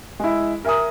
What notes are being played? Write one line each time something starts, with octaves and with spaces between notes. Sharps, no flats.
G#3 E4
A#4 E5 G#5 A#5 D#6